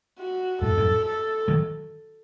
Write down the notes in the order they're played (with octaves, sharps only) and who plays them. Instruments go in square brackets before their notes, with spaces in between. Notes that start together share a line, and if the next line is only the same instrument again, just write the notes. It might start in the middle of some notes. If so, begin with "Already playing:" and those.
[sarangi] F#4
[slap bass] F#2 A2 [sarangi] A4
[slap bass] F#2 A2
[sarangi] A4
[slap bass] D#3 F#3